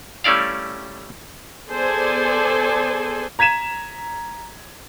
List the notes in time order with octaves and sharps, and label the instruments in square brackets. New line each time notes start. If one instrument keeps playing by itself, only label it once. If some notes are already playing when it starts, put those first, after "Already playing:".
[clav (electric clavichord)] G3 A3 C#4 E4 D5 F5
[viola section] B3 G#4 A4 C5 D5 G#5
[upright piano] A#5 G#6 B6 D#7 E7